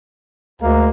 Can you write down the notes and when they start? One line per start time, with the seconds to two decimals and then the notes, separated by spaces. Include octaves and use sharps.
0.62 D2 G#3 A#3